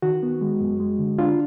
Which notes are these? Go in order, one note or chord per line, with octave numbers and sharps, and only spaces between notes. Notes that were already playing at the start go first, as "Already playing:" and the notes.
D#3 F#4
B3
G#3
F#2
G#3
D3
D4 F4